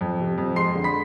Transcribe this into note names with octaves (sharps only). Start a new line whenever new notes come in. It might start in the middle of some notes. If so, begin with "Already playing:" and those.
F2
C3
F2
G#3 C6 C7
D3
B5 B6